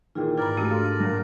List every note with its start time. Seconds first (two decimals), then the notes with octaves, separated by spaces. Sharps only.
0.15 A#2 D#3 E3 F4 G#4 G5
0.38 G#2 A#4 B4 D5 A#5 B5
0.57 G#3 A3 D4 F#4 G4
0.70 A4 F5 C6 F6
1.00 G2 A#2 F#3 A#6